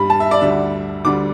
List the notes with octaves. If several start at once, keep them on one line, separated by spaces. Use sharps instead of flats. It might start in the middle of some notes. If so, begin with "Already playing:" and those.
Already playing: G2 G3 B5
A5
E5
D5
D2 D3 G3 E5
D2 D3 G3 D6